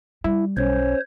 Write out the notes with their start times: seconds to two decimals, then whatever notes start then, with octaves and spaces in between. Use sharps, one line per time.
0.24 G3 E4
0.57 B1 C#4 C5 C#5